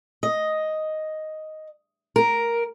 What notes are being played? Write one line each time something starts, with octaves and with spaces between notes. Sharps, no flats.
D#5
A#4